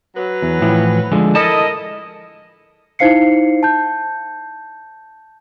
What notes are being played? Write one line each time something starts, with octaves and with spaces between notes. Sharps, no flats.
F#3 B4
E2
A2 E3 F3
D3 F3 G#3
E4 A4 A#4 D#5 A5
D#4 E4 C5 F5 C7 C#7
A5 G6